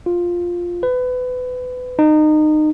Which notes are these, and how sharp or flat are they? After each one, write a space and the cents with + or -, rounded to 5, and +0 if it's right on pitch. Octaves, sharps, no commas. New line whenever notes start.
F4 +5
B4 +25
D#4 -25